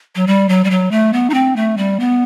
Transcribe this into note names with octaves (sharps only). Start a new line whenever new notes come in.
F#3
G3
F#3
G3
F#3
A3
B3
D#4
C4
A3
G3
B3